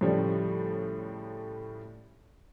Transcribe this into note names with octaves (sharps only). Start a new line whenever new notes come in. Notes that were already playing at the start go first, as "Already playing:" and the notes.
A2 C#3 F3 G3 C#4